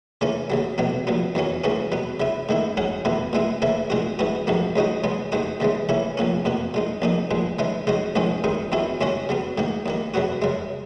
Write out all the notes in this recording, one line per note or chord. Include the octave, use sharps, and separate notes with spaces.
C#3 E3 A#3 C#4
D#2 C#3 F#3
B1 B2 F#3 A#3
A#1 A#2 F#3 B3
E2 D#3 F#3 C#4
C#2 C#3 E3 A#3 C#4
B2 F#3 B3
C#3 E3 B3 E4
G#2 D#3 A#3 E4
G#2 F#3 C#4 F#4
E2 B2 A#3 E4
A#2 G#3 B3 E4
C#3 E3 A#3 E4
A#2 G#3 D#4 F#4
G#2 E3 B3 F#4
A#1 G#2 F#3 A#3
C#2 C#3 G#3 D#4 F#4
C#3 G#3 B3
D#2 D#3 G#3 D#4 F#4
D#2 C#3 E3 G#3
C#3 E3 A#3 C#4 E4
A#1 A#2 A#3 C#4
E2 B2 A#3
A#2 G#3 D#4
A#1 A#2 A#3 D#4
A#1 A#2 G#3
C#3 E3 G#3 D#4
C#3 G#3 D#4 F#4
A#1 G#2 D#3 G#3 C#4
F#2 D#3 G#3 D#4
E2 D#3 F#3 C#4 E4
D#2 C#3 G#3 C#4 F#4
C#3 F#3 B3
G#2 D#3 A#3
D#2 D#3 A#3
F#2 C#3 F#3 B3 F#4
F#2 C#3 G#3